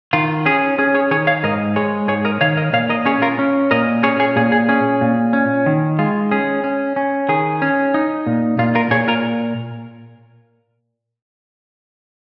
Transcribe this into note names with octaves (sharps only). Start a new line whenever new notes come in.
D#3 F4
C#4 G#4
C#4 G#4
G#4 C#5
D#3 G#4 C#5
C#5 F5
G#2 A#4 D#5
G#3 G#4 C#5
G#2 G#4 C#5
A#4 D#5
D#3 C#5 F5
A#4 D#5
A#2 C#5 F5
A#4 D#5
C#4 G#4 C#5
F4 A#4
C#4
A#2 A#4 D#5
C#4 G#4 C#5
G#4 C#5
A#2 G#4
G#4
C#4 G#4
A#2
C#4
D#3
G#3 F4
C#4 G#4
C#4
C#4
D#3 G#4
C#4
D#4
A#2
A#2 F4
F4 A#4
A#2 G#4 C#5
F4 A#4